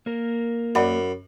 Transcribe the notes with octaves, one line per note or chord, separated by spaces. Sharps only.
A#3 A#4
F#2 D5 F#5 B5